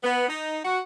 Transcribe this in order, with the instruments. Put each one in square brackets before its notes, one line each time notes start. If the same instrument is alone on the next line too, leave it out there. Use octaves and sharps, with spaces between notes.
[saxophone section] B3
D#4
F#4